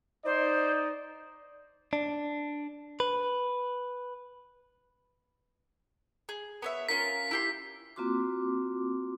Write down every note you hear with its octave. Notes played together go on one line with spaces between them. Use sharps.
D#4 C5 D5 D#5
D4
B4
G#4
B3 C#5 E5
C#4 F4 A#4 B6
E4 G4 C6
A#3 C4 F4 F#4 C6 D6